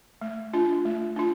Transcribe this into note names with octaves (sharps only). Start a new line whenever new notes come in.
A3
D4 F4
A3
D4 F4